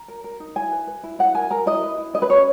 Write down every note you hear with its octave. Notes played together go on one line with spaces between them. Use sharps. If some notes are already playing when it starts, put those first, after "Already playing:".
Already playing: A#5
A#4
A#4
D#4
E4 G#5
B4
B4
E4
E4 F#5
A#4 G#5
A#4 A#5
E4 D#5
B4
E4
C#4 D#5
B4
C#4 C#5